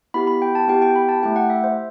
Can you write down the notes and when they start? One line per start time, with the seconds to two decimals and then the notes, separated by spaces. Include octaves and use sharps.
0.14 B3 E4 G4 B5
0.27 B5
0.42 G5
0.55 A5
0.68 B3 E4 G4 G5
0.82 G5
0.96 B5
1.09 A5
1.23 A3 E4 G4 G5
1.36 F#5
1.50 E5
1.64 C5